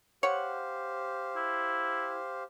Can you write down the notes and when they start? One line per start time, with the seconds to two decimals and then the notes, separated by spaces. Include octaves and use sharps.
0.23 G4 C5 C#5 F5 F#5
1.36 E4